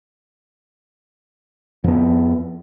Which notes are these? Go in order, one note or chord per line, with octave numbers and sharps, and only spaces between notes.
F2 B3